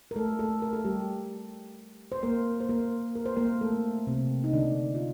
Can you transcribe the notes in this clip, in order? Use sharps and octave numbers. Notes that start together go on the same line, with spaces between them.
A#4
A3 A4
A3 A4
A#4
A4
G3 G4
C5
A#3 A#4
C5
A#3 A#4
A#4
C5
A#3 A#4
A3 A4
C3 C4
D#4
D3 D4
F4